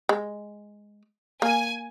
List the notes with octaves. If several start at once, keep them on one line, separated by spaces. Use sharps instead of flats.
G#3
A#3 G#5